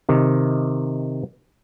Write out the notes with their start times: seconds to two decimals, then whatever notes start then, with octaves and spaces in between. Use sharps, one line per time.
0.09 C3 D#3